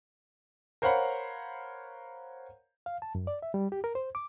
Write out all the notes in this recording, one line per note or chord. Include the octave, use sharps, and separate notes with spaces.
A#4 C5 C#5 F5 F#5 B5
F5
A5
F#2
D5
E5
G3
G4
A#4
C5
D6